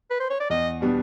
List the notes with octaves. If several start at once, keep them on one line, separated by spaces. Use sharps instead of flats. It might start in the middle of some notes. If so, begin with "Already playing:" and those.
B4
C5
C#5
D5
E2 D#5
B2 G3 B3 D4